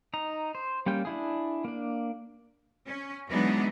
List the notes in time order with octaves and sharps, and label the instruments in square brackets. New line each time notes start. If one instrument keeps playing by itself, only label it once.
[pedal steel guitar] D#4 A#5
C5
G3 A#3 C#4 G5
D4 E4 G#4
A#3 D4
[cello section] C#4
E3 F#3 G#3 B3 D4 D#4